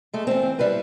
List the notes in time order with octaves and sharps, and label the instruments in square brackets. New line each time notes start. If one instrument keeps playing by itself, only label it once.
[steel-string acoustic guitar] G#3 A3
E3 C4
G3 E4 B4